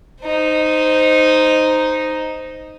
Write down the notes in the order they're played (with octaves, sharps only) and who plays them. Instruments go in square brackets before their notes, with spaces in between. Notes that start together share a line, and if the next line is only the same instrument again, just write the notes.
[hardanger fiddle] D#4 C5